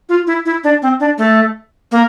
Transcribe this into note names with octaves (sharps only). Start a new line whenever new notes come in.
F4
E4
E4
D4
C4
D4
A3
A#3